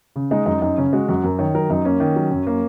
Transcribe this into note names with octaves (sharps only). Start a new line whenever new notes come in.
C#3
G#3 D#4
F#2 D#4
F#2 D#4
C#3 C#4
G#3 F#4
F#2 F#4
F#2 A#4
D#3 C#5
F#3 A#4
F#2 D#4
A#3 C#4
D#3
F#3
F#2
A#3